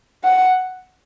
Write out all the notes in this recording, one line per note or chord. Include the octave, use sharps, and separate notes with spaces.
F#5